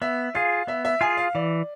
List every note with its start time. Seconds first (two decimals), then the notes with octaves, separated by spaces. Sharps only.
0.02 B3 E5
0.35 F4 G#4 F5
0.67 B3 E5
0.85 E5
1.01 F4 G#4 G#5
1.17 F5
1.35 E3 D5